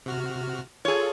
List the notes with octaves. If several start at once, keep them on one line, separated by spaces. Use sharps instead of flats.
C3 F#4 F6
F4 G#4 A4 C#5